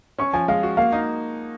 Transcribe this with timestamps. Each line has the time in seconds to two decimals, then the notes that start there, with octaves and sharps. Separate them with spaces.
0.18 C#4 C#6
0.33 F3 G#5
0.48 G#3 F5
0.63 F#4
0.77 A#3 F5
0.92 D#4